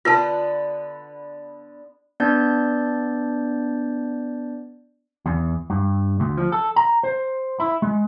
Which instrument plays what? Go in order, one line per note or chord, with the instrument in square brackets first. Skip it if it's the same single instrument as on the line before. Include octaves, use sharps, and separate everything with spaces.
[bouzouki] D3 B3 [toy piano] F4 B4 A5
[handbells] B3 D4 D5 G6
[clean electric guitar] E2
G2
D2
F3
A4
A#5
C5
E4
G#3